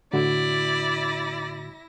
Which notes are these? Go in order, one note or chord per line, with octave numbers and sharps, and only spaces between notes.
A2 D3 E4 F#4 D5 A#6